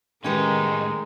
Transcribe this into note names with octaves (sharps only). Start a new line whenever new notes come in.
A2 D#3 G#3 C#4 D#4 G4 B4